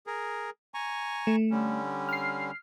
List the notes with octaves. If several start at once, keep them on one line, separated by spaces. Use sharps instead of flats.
G#4 A#4
G#5 A#5 C#6
A3
D3 G3 C#4
F6 C7